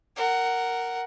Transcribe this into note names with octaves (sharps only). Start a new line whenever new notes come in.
A#4 F#5